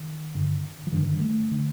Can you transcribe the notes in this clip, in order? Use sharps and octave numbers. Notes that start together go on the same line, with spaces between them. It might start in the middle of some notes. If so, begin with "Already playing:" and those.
Already playing: D#3
G2 D3
F3
G2 D3 D#3
A3
D3